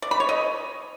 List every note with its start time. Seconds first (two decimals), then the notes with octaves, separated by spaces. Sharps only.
0.02 D5
0.11 B5
0.20 C#5
0.29 D#5